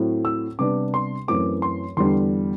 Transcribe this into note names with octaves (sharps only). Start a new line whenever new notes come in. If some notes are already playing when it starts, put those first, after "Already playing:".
Already playing: A2 F#3 C4
E6
C3 G3 B3 D4 D6
C6
F#2 E3 A3 C4 D6
C6
E2 D3 G3 D4 C6